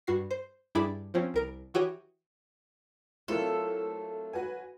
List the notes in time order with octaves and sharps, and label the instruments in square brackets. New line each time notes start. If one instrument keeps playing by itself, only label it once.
[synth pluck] G2 F#4 C7
C5
G2 D4 E4 G#4 B5 D6
F3 C4 C#4
C2 A#4 D7
E3 F#4 G4 C#5 D#6
[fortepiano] F#3 A#3 F4 [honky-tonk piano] A3 C4 E4 [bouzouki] A4
[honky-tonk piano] F#4 B4 G#5